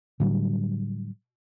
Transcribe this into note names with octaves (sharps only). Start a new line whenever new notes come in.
A2 D3 F#3 G3